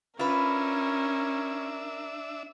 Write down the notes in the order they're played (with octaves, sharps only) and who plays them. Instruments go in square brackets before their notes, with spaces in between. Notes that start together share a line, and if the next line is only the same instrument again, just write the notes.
[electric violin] C#4 [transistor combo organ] D4 E5 [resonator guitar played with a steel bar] F4 B4 [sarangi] A#4